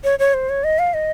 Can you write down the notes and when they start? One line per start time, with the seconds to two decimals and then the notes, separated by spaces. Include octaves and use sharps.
0.04 C#5
0.19 C#5
0.34 C5
0.49 C#5
0.64 D#5
0.79 F5
0.94 D#5